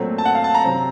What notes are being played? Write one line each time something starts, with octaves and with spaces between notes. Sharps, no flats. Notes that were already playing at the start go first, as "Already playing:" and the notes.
Already playing: A#2 F#3 A3 C4
A5
F#5
F5
A5
A#5
C3 F#3 C4